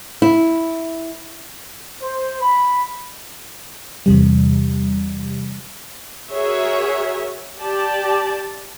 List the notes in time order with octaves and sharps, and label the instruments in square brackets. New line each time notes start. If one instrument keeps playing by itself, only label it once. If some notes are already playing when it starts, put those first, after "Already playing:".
[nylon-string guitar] E4
[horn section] C5
B5
[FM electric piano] E2 C3 G3
[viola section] F#4 G#4 A#4 C#5 E5
G4 D5 A5